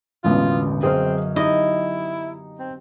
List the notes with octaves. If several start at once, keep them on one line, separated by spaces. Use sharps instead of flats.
E1 A1 B2 D3 B3 F4
F#2 C4 G#4 C5 D#5 F5
D#4 E4 G4 D#5
C4